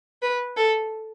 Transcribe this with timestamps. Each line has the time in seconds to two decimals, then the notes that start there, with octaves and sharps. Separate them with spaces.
0.22 B4
0.56 A4